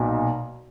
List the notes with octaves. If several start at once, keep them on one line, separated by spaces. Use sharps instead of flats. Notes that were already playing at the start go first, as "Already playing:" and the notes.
Already playing: B1 A#2